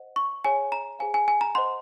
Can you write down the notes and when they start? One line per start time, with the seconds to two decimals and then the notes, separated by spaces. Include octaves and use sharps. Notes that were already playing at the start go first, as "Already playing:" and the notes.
Already playing: C5 D#5 F#5
0.16 C#6
0.45 G#4 C#5 F#5 G#5
0.72 A#5
0.99 G#4 C5 F5 G#5
1.14 G#5
1.28 G#5
1.41 A#5
1.55 C5 D#5 F#5 C6